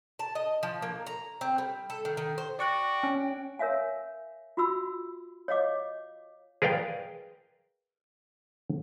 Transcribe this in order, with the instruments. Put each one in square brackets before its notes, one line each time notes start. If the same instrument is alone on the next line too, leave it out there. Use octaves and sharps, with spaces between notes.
[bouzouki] A5
D#5
F3
A#3
A#5
C4
G3
A4
D#3
D#3
C5
[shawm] F#4 [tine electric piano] D5 C#6 F#6 [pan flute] G5
[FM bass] C#4
[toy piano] A#4 C#5 E5 F5 G#5
F4 F#4 B5 E6
C#5 D#5 F5 D6
[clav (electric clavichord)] G#4 A#4 B4 D5 F5 G5